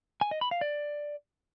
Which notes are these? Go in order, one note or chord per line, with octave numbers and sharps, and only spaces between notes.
G#5
D#5
B5
F5
D5